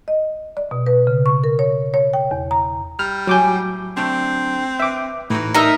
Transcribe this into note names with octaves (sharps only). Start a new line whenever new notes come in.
D#5
D5
B2
B4
C#3
C#6
A#4
C#5
C#5
G5
E2
A#5
G3 F6
A2 F#3 G#5 D6 G6
D3 A3 C4 D4
B4 E5 D6
A2 E3 D#4 F#4 B4
G3 D4 D#4 A#4 E5